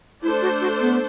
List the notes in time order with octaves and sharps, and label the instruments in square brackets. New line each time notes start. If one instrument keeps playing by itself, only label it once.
[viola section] A3 D4 A4 C5 [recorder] E4
[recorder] F#4
F#4
B3